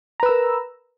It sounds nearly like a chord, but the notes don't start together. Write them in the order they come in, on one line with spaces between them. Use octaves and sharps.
A#5 B4 E6 A#4